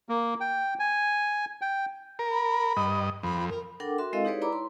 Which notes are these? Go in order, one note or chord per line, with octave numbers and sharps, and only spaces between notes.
A#3
G5
G#5
G5
A#4
B5
G2 D#5
F2 B5
A#4
D4 A4 A#4 F#5 G5 D6
F#4 A#4 E5 C6
G#3 C4 E4 A4 D#5 F5
D#4 G4 G#4 B4 C#5 D5
E4 B4 D5 A#5 B5 D6
C6